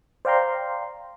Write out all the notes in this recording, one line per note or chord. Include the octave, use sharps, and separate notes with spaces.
C5 D5 F5 G5 A#5 C6